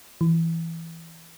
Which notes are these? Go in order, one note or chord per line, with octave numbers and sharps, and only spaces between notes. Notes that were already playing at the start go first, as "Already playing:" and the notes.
E3